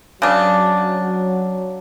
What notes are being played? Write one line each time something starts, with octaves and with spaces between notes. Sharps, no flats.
C#3 F#3 D4